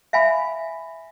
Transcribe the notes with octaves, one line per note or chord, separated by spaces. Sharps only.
E5 F5 G#5 B5